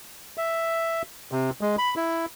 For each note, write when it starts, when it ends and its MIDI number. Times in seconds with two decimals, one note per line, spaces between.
0.38 1.02 76
1.32 1.50 48
1.61 1.76 56
1.78 1.94 83
1.97 2.26 64